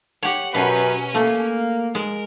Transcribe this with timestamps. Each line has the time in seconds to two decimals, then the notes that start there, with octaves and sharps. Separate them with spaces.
0.23 G4 C#5 F#5
0.55 F#2 B2 C#4 B4
1.15 A3 A#3
1.95 G#3 A#4